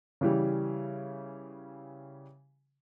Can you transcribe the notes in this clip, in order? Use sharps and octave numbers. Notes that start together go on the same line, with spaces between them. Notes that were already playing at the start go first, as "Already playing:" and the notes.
C#3 E3 G3